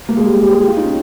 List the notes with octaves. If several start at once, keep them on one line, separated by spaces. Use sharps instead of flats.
A#3
G#3
G3
G4
G#4
G4
F4
D#4
C#4